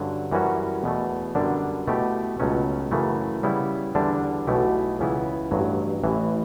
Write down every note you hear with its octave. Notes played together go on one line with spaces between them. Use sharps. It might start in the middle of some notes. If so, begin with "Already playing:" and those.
Already playing: G2 D3 F#3 C#4
F#2 E3 G3 C#4 F#4
E2 B2 A3
F#2 D3 G3 B3 D4
B2 A3 E4 G4
C#2 B2 F#3 A3 C#4
F#2 C#3 E3 A3
C#3 G3 B3 E4
E2 D3 G3 D4
B1 B2 A3 E4 G4
C#2 C#3 E3 B3 E4
A1 G2 F#3
A1 A2 E3